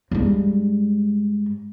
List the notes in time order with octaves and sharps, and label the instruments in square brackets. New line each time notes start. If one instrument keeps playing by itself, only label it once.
[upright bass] G2 G#3